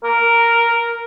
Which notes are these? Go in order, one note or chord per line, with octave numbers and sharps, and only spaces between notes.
A#4